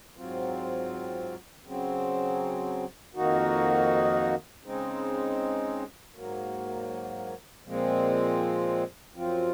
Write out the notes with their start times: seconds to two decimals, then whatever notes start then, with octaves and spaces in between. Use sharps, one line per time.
0.16 G#2 F#3 C4 F4
1.65 C#3 F#3 C4
3.15 F2 D#3 A#3 D#4 F#4
4.64 C#3 G#3 C4 D#4
6.15 G#2 F#3 A#3
7.64 A#2 F3 G#3 C4
9.14 F#2 F3 C4 F4